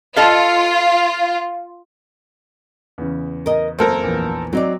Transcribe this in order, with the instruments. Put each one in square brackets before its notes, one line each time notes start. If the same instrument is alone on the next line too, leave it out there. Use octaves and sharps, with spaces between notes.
[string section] F4 [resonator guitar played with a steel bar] A4 D#5 F5
[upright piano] E2 C#3
[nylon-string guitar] A#4 D#5
[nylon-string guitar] F#2 A#3 [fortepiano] C4 A4 A#4
[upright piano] A#1 E2
[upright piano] F#3 [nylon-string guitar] C4 D#4 D5